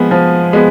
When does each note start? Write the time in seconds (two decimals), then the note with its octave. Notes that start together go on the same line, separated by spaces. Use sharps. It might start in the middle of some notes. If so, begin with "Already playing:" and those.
Already playing: F3 G#3 B3
0.11 F3
0.53 G#3 B3